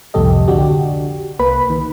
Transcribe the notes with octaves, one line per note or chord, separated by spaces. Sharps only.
C2 F2 A2 G4 A4 D#5
D3 D4 F#4 G4
C2 A#3 B4 B5
D#3